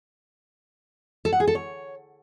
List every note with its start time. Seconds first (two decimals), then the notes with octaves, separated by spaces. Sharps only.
1.25 A4
1.32 F#5
1.40 G#4
1.47 A4
1.55 C#5